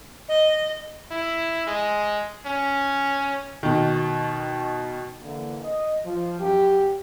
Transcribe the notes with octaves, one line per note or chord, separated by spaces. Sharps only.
D#5
E4
G#3
C#4
B2 D#3
D3 E3 A#3
D#5
F3
F#2 G4